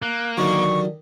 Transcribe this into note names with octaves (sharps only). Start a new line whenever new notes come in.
A#3 F#6
D3 D#3 F#3 G3 C#6